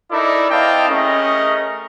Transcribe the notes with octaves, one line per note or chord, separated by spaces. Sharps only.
D#4 E4 A4 A#4 D5
C4 E4 D#5 F5 G5 A5
A3 C#4 G#4 A#4 D#5